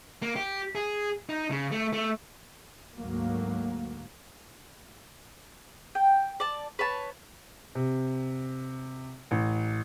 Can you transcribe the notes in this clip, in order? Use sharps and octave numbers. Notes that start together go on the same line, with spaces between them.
A#3
G4
G#4
D#4
C#3
A3
A3
D2 G#2 F#3 A#3
G5
D5 A5
B4 C#5 A5
C3
A1